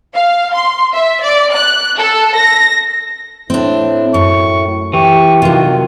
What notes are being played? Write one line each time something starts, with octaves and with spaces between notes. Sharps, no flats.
F5
C6
E5
D5
F#6
A4
A#6
A2 C4 D4
F#2 C#6
E3 G4 C#6
C3 D#3 F#3 F4